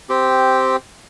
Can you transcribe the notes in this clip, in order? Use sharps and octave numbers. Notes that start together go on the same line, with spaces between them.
C4 G4